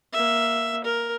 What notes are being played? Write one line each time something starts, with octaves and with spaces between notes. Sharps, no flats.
A#3 E5
A#4